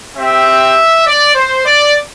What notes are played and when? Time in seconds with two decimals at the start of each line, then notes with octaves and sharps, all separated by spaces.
0.16 C4 G4 E5
1.05 D5
1.35 C5
1.64 D5